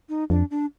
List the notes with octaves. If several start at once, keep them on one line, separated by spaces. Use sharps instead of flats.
D#4
F2 D4
D4